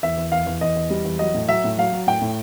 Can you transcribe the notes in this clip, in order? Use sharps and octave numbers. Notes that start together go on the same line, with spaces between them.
E2 E5
E2
E2 F5
E2
E2 D#5
E2
G3
E2
F#3 D#5
A2
F#3 E5
A2
F#3 F5
F#3
A2 G5
A2